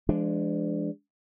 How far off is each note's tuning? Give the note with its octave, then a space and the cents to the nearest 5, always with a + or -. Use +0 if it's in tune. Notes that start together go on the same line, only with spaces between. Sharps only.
F3 -45 G#3 +0 D4 +0